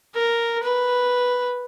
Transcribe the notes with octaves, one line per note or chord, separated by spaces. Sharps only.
A#4
B4